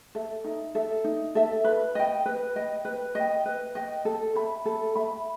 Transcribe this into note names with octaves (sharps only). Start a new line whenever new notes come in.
A4 E5
D#4
A4 E5
D#4
A4 E5
B4
D#5 G5
B4
D#5 G5
B4
D#5 G5
B4
D#5 G5
A4
E5 B5
A4
E5 B5